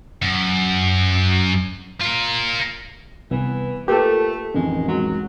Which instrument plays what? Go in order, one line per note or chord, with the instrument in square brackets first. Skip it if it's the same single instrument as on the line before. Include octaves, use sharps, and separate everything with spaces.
[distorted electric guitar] F#2
F4 A#4
[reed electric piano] C2 [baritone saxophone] E3 [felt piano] B3
[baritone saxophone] A3 [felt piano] A#3 F4 B4 [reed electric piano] G4 A4
[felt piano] A1 F2 D#3 [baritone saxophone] G#3
[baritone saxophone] F#3 [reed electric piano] G#3